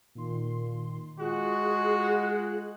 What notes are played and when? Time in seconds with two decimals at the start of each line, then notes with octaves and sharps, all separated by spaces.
0.15 A#2 D#3 C6
1.19 G#3 F4 F#4 G#4 F#6